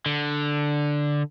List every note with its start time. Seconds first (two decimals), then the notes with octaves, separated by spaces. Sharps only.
0.06 D3